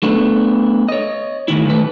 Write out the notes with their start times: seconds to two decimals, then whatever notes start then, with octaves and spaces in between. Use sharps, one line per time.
0.03 A3 B3 D4
0.89 C#5 D#5
1.48 A2 D#3 E4
1.65 D#3 A3 B4